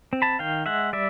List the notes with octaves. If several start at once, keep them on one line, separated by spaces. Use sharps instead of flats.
C4
A5 B5
D#3 F5 G5
G#3 E5 F#5
G3 D5 E5